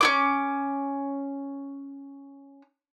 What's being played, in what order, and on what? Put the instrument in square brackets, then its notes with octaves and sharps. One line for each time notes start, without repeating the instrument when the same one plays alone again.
[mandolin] C#4 E4 D6